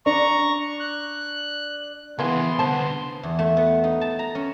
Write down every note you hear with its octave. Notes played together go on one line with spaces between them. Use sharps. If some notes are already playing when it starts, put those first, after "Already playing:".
D4 A#5 C#6
F#6
C#2 E3 A#3 B3 E4 G#4 C6
C2 D3 C5 A5
E2
A3
B3
D#4
A5
A#5
C#4